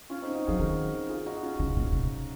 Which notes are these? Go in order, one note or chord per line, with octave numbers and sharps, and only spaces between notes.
C#4 F4
C4 D#4
D#4 F#4
F3 F4 G#4
D#3 F#4 A#4
F4 G#4
D#4 F#4
C#4 F4
C#3
A#2
C3